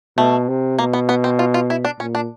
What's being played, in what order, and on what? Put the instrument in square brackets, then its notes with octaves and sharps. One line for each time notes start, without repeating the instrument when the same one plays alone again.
[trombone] B2 [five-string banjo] A3
[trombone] C3
[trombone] B2 [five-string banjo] A#3
[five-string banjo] B3
B3
C4
F4
F4
E4
D4
[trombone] A#2 [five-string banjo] C#4
[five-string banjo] D4